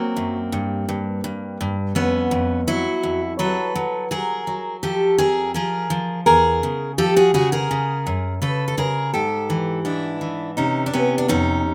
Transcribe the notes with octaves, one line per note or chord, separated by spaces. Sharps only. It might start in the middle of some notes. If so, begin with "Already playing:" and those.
Already playing: F#3 A#3 C4
F#2
G2
G2
G2
G2
F2 B3 C#4
F2
F#3 E4 F#4
F2
F#3 A4 B4
F#3
F#3 G#4 A#4
F#3
F3 G4 A4
F2 G#4 A#4
F3 G#4 A#4
F3
E2 G#4 A#4
C#3
F3 G4 A4
F#4 G#4
C#3 F#4 G#4
G#4 A#4
C#3
F#2
C#3 A4 B4
A4
C#3 G#4 A#4
G#2 G4 A4
E3
G#2 D4 E4
E3
C3 C#4 D#4
D4
C3 B3 C#4
D4
F2 C#4 D#4